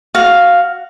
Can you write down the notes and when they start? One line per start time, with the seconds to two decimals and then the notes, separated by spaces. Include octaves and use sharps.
0.15 F#4 F5